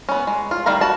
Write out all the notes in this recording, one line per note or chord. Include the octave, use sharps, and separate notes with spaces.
B3 C#4
G#3
F4
D#3 G3 F5 A#5
F#4 A5